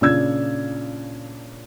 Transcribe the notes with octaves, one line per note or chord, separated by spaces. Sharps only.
A#2 C#3 D4 E6 G#6